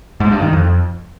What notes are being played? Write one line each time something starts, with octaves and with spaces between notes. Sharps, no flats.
G#2
G2
D#3
F2